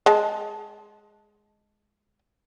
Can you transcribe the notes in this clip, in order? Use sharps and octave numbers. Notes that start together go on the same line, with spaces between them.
G#3 A5